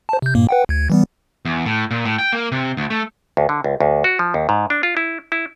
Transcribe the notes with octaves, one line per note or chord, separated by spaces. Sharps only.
C5 A5
C3 G6
G2 A#2 A#3
B4 F#5 G5
D2 G#6
E3 G3 B3
E2
A2
A#2
A2
G5
A#3
C3
D2
A3
D2
D3
C#2
D2
F#4
F3
D#2
G#2
D4
F4
E4
E4